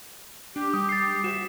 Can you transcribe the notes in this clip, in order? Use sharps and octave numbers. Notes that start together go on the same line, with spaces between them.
D4 G4
G3 D#6
A6 C7
F#4 C5 E5 E7